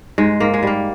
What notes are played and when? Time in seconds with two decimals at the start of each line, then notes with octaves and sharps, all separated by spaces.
0.18 G#2 G#3
0.40 G#2 A#3
0.54 G#3
0.63 G3 A#3